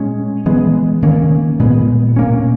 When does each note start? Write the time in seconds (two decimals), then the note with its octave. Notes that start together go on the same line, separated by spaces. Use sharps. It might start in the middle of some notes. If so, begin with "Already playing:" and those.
Already playing: A#2 G#3 C#4
0.46 E3 G#3 B3
1.02 D#3 A#3 C#4
1.60 A#2 G#3 B3
2.16 B2 A#3 C#4